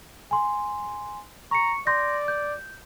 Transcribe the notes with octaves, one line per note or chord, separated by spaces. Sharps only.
G#5 C6
A#5 C#6 C#7
D5 C6 G6 A#6
G6